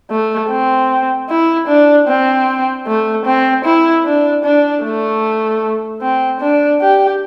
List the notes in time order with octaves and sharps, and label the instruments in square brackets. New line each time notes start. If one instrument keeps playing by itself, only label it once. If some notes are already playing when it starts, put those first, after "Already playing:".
[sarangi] A3
C4
E4
D4
C4
A3
C4
E4
D4
D4
A3
C4
D4
G4